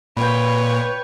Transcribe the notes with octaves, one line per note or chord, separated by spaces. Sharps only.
A#2 B4 C#5 G5 B5